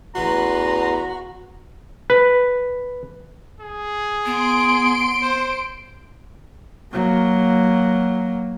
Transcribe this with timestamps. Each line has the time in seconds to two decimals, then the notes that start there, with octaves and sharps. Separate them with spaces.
0.15 A1 E2 F#4 B4 A#5 C6
2.10 B4
3.60 G#4
4.26 B3 C6 D7
5.22 C5
6.92 F#3 A#3